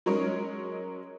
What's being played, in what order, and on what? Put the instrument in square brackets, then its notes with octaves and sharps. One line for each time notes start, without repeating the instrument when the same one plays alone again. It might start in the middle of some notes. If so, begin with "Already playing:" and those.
[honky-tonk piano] F#3 G#3 C#4 A#4 C#5 D#5